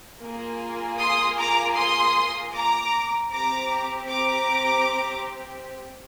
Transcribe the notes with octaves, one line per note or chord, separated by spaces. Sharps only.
A#3 F4 G#4
C6 D#6
A#5 D6
C6 D#6
A#5 D6
C4 G4 A#5 D6
A#5 D6